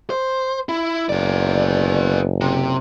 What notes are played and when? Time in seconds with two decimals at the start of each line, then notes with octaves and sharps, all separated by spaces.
0.10 C5
0.69 E4
1.09 F#1 B3 D5
2.41 C3